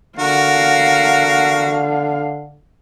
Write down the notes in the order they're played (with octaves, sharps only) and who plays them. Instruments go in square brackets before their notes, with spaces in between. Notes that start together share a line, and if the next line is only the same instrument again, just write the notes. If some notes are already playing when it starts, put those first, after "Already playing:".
[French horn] D3 [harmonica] F#4 [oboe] A#4 [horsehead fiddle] F5